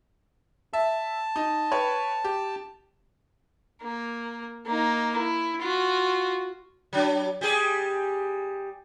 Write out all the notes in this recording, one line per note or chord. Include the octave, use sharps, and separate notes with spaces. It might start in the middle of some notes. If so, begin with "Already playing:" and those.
E5 A5
D#4
B4 C#5 G5
G4
A#3
A#3 D#4
E4
F4 F#4
F#3 D4
G3 G4 G#4